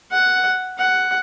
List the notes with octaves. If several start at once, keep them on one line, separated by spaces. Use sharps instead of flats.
F#5
F#5